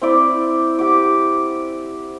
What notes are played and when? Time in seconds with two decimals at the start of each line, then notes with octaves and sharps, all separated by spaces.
0.02 C4 E4 D5
0.79 G4 F#5 D6